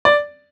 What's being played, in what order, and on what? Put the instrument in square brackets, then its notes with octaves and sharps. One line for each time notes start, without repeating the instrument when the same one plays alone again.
[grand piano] D5